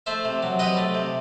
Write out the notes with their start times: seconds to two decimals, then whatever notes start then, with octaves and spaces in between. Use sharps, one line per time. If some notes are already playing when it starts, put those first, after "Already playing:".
0.06 A3 C5 E5
0.25 C3
0.43 F#3
0.59 C3 B4 D#5
0.77 A3
0.94 C3